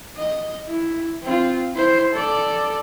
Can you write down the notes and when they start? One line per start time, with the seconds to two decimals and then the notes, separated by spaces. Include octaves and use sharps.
0.17 D#5
0.68 E4
1.23 C4 F4
1.75 E4 C5
2.14 A4 D5